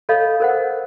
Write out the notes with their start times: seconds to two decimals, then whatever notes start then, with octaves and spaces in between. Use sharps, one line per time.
0.09 A4 C#5 D#5 F5 B5
0.40 A#4 C5 F#5